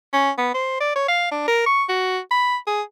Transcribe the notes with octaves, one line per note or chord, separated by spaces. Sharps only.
C#4
B3
C5
D5
C#5
F5
D4
A#4
C#6
F#4
B5
G#4